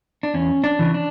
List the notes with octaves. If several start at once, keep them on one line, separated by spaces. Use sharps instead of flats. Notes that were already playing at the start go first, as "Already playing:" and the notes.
D4
E2 C#4
D4
C#3 E3
D4